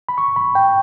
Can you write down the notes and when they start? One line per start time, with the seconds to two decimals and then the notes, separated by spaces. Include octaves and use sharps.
0.09 B5
0.18 C#6
0.36 B5
0.55 G5